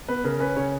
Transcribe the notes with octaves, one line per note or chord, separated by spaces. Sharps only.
B3 B4
C#3 A#4
C#4 B4
C#3 C#5